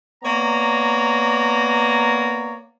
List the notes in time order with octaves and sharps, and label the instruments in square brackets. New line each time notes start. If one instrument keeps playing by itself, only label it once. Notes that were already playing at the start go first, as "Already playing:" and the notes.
[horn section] A#3 B3 C#5 D5 A#5